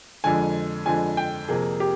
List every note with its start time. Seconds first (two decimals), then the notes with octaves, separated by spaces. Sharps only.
0.24 F2 D3 F3 G#3 G#5
0.86 F2 D3 F3 G#3 G#5
1.17 G5
1.49 F2 C3 F3 A#3 G#4
1.80 G4